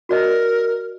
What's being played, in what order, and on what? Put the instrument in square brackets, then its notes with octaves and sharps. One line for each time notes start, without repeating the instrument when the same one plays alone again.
[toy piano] F#4 D5 D#5 [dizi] A#4